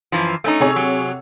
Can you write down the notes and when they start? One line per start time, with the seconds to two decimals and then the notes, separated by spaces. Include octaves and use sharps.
0.12 F#2 E3 F3
0.44 A3 C#4 D#4
0.60 C3 G#4 C#5
0.76 F#3